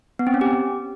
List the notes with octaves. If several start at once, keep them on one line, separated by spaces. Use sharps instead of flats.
B3
C4
C#4
G4